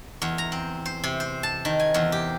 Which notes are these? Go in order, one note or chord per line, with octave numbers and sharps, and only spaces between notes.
E2
A#5
C4
C5
C3
C5
A5
D#3
G#5
E2
G4